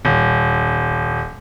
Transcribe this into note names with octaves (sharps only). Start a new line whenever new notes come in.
D#1